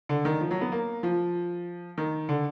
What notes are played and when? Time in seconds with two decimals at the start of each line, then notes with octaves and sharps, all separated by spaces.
0.09 D3
0.25 D#3
0.41 F3
0.51 F#3
0.61 B3
0.72 A#3
1.03 F3
1.98 D#3
2.29 D3